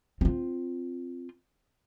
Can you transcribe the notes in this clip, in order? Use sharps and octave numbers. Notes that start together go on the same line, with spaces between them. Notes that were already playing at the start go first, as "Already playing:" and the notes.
C4 F4